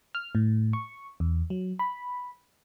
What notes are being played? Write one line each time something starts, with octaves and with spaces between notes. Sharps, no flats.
F6
A2
C#6
E2
F#3
B5